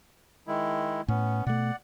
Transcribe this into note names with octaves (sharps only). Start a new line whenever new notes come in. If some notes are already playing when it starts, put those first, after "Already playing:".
D#3 G#3 E4
A2 B3 C#4
B2 A3 D5 F#5